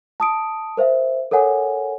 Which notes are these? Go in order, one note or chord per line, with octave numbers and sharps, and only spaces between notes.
A5 D#6 D7
A#4 C5 E5 F5
A4 A#4 C#5 F#5 G#5